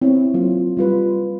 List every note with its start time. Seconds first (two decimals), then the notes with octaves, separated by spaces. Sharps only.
0.02 C4 E4 C#5
0.34 F#3 A#3 F4
0.77 G3 F4 B4